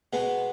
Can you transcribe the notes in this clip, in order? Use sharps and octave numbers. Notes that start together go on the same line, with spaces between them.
B2 G#3 B3